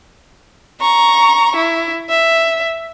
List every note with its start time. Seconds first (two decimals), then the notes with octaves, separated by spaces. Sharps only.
0.81 A#5 C#6
1.56 E4
2.09 E5